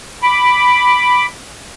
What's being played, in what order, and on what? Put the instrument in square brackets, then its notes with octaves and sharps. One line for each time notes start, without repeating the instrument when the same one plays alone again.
[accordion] B5 D6